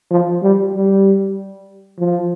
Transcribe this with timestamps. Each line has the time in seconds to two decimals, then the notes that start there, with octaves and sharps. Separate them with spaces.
0.11 F3
0.43 G3
0.74 G3
1.99 F3